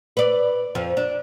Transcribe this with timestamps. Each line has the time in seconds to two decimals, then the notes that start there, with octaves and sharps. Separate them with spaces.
0.17 B4 D5
0.75 F2 F3
0.97 D4